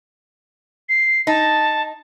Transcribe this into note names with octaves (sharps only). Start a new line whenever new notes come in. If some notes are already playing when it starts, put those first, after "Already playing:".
C7
D#4 A5